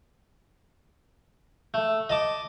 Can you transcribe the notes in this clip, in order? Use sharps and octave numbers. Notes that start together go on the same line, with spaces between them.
A3
D#5 A5 D6